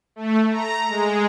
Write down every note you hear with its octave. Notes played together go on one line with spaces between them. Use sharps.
A3
A#5
G#3